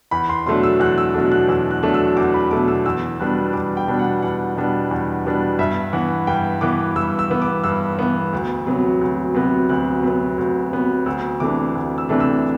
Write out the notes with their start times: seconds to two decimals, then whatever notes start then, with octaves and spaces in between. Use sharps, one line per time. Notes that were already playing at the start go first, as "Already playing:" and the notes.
0.11 E2 B5
0.29 C6
0.46 B2 F#3 A3 D4 C6
0.63 E6
0.80 E2 F#6
0.98 E6
1.14 B2 F#3 A3 D4
1.32 F#6
1.48 E2 E6
1.71 F#6
1.83 B2 F#3 A3 D4
1.94 E6
2.17 E2 D6
2.34 B5
2.51 B2 F#3 A3 D4 D6
2.68 E6
2.86 E2 E6
3.20 B2 G3 B3 D4 F#6
3.53 E2 D6
3.77 G5
3.88 B2 G3 B3 D4
3.99 F#5
4.22 E2 F#5
4.56 B2 G3 B3 D4
4.91 E2
5.25 B2 G3 B3 D4
5.59 G2 E5
5.93 E3 B3 F#5
6.27 G2 G5
6.61 E3 B3 D6
6.96 G2 E6
7.19 E6
7.30 E3 B3
7.42 D6
7.64 G2 E6
7.99 E3 B3
8.33 D2
8.66 C3 F#3 B3
9.01 D2
9.35 C3 F#3 B3
9.69 D2 F#6
10.03 C3 F#3 B3
10.38 D2
10.72 C3 F#3 B3
11.06 D2 E6
11.40 C3 E3 A3 D4 D6
11.75 D2
11.98 E6
12.09 C3 E3 A3 D4
12.20 E6